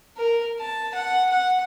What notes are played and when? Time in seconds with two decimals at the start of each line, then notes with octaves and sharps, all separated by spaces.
0.16 A#4
0.60 A5
0.95 F#5
1.30 F#5